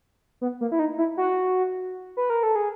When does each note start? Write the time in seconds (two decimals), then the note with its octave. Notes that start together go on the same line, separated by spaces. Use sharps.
0.41 B3
0.61 A#3
0.72 E4
0.79 D#4
0.98 E4
1.17 F#4
2.17 B4
2.30 A#4
2.43 A4
2.56 G#4